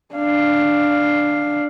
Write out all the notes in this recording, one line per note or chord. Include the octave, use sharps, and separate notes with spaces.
D4 F5